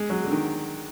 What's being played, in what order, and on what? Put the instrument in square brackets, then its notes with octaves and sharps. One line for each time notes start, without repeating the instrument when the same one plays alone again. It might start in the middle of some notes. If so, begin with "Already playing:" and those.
Already playing: [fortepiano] G#3
F#3
D3
D#3